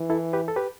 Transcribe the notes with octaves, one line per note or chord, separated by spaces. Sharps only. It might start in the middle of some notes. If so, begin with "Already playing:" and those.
Already playing: E3
E4 A4
G4 B4
A4
G4 B4